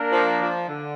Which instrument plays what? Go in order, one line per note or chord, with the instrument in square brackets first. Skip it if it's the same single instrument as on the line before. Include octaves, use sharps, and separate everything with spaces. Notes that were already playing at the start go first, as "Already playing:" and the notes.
Already playing: [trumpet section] A#3 D4 A#4
[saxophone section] F3
F3
D3